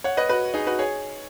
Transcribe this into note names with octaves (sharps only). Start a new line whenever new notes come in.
C#5 F#5
B4 D#5
F#4 B4
D#4 G#4
F#4 B4
G#4 C#5